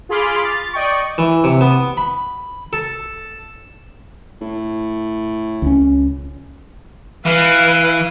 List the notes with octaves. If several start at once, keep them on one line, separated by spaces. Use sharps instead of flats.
F4 G#4 B5 C6 D6 F6
A6
D5 D#5 G5 C#6
E3
C3
B3
B5
A4
A2
C#2 C#4
E3 B4 F5